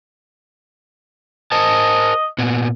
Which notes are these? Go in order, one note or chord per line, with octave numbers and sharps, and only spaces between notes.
A#4 C5 D#5 A5
A#2 B3